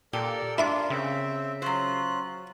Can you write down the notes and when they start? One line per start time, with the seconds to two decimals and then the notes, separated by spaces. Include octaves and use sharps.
0.13 A#2 G4 A4 A#4 D5
0.58 D4 E4 F4 A#4 C6 D6
0.90 C#3 C4 E5
1.62 F#3 C#4 F4 C5 F#6